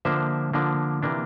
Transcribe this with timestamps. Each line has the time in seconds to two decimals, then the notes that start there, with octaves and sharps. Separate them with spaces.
0.05 D3 F3 A#3 D4 C5 E5
0.53 D3 F3 A#3 D4
1.03 C3 E3 A#3 D4